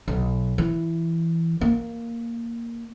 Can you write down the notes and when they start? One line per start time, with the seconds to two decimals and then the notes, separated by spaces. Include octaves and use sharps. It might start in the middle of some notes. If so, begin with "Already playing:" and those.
0.08 B1
0.58 E3
1.61 A#3